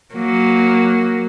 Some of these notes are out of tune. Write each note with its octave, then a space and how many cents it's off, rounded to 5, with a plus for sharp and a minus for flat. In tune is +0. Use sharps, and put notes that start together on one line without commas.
F#3 +0 A#3 +0